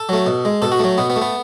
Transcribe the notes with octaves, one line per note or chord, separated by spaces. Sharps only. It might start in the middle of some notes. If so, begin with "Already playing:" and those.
Already playing: A4
F#3 A3
B2
G#3
B2 A4
F#4
F#3 A3
B2 B3
B3
A3
B3